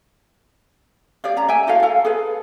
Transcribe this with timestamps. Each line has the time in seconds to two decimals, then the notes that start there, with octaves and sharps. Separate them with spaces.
1.24 G4 D5 F5
1.37 C#4 A#5
1.48 E5 G5 G#5
1.67 E4 F#4 A4 F5
1.83 A4 F5
2.05 G#4 A4 B4